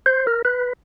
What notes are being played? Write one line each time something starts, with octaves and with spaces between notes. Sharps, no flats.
C5
A#4
B4